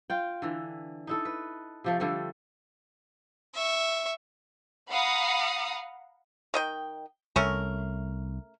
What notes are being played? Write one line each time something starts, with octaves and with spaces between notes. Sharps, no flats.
F4 G5
D3 E3
D#4 E4 A4
B4
C3 F3 A3
D3 F3 G3 A3
E5 C#6
F5 F#5 A#5 B5 D#6
D#3 D#5 G5
C2 A3 C#4 A#4